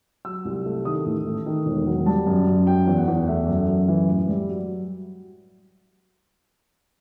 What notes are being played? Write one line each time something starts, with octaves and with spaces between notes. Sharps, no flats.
F#3 E6
C2
A3
D#3 D#6
A1
A3
D#3
E1
F#3
G3 A5
F#2
F#2
F#3 G5
E2
F#5
E2
A3 E5
F#2
F#2
E3
A1
G3
F#3